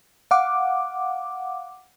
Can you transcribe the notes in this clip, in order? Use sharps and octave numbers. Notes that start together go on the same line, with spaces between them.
F5 F#5 D6